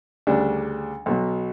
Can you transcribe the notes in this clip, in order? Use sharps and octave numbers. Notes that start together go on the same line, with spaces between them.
D2 C#3 G3 D4
B1 B2 F#3